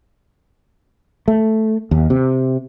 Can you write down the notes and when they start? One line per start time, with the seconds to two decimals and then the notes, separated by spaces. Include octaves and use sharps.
1.28 A3
1.91 D#2
2.10 C3